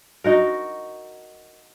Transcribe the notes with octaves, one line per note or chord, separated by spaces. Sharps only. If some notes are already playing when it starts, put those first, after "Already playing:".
D#4 F#4 A#4